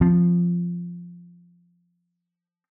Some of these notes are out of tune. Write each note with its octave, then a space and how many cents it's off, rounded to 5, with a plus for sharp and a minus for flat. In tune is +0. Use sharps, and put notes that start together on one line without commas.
F3 +0 C4 +0